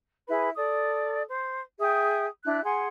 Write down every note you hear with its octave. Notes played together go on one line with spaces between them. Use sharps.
E4 G#4 B4 B5
A4 D5 D#6
C5
G#4 E5 G5 D#6
D4 E4 F#6
G#4 F#5 G#5 C6